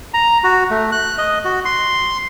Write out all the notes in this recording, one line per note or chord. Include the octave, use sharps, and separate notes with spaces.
A#5
F#4
A3
F#6
D#5
F#4
C6